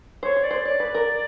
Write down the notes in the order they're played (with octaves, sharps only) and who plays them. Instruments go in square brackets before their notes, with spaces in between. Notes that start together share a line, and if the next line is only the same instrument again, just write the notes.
[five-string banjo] C5 [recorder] C#5
[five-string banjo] C5
[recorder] D5
[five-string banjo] C5
[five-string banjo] C#5 [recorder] D5
[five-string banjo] B4
A#4